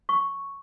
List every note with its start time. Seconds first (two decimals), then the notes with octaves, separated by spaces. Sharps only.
0.09 C#6